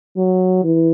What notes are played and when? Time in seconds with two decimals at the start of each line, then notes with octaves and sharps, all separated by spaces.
0.17 F#3
0.64 E3